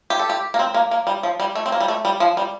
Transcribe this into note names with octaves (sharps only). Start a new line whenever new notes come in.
G4
A4
G4
A#3
C4
A#3
A#3
G3
F3
G3
A3
C4
A#3
G3
A3
G3
F3
G3